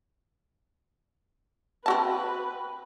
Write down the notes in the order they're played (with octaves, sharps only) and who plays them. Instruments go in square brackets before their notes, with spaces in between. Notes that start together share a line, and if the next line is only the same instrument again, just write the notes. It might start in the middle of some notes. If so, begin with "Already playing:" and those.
[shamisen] C4 F#4 A5 [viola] B4